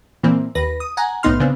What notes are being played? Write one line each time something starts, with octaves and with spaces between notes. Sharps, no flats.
A#2 E3 A#3 C4
D#2 B4 A#6
D#6
F#5 G#5 A#5
B1 A2 B3 D#4 C6 F6
C#3 B3 C4 D4